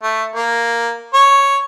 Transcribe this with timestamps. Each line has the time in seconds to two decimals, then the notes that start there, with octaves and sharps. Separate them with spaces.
0.03 A3
0.36 A#3
1.14 C#5